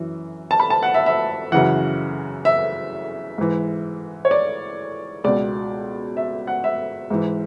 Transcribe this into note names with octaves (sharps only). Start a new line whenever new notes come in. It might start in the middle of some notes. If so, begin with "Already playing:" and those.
Already playing: F#2 E3
A5
B5
A5
F#5
E5
E5
F#2 C#3 E3 F#5
E5
G#2 E3
C#5
D5
C#2 B2 D5
E5
F#5
E5
G#2 E3